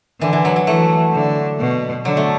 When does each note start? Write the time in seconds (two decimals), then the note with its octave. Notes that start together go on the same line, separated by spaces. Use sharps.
0.21 D3 E3
0.33 E3
0.45 F#3
0.56 F#3
0.67 E3 A3
1.13 D3
1.59 B2
2.05 D3 F#3
2.17 A3